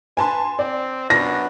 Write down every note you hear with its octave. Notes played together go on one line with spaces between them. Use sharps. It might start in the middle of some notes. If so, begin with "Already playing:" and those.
B4 G#5 A5 C6
C4 D5
F#2 B3 D4 F#4 A#6